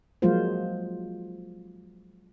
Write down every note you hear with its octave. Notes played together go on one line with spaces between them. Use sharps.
F3 F#3 G#3 A#3 F4 C5